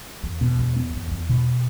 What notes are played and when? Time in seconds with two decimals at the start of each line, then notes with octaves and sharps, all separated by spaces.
0.23 E2
0.41 B2
0.59 E2
0.76 B3
0.94 E2
1.11 E2
1.29 B2